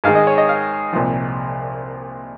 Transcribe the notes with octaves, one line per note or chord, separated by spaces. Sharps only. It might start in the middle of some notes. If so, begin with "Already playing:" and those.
G#2 D#3 G#3 F5
D#5
C#5
D#5
F5
C2 A#2 F3